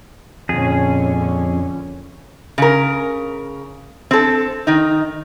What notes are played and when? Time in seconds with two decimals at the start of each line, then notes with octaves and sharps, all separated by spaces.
0.49 F2 A#2 D3 C#4 G#4
2.58 C#3 A#4
4.11 C4 A4
4.67 D#3 D#4